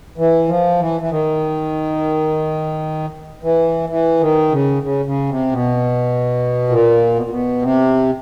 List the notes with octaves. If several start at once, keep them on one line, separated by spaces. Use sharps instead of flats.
E3
F3
E3
E3
D#3
E3
E3
D#3
C#3
C#3
C#3
C3
B2
A#2
B2
A#2
B2
C3